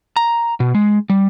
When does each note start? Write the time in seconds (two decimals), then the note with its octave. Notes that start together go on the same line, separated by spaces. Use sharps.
0.16 A#5
0.60 B2
0.75 G#3
1.10 G3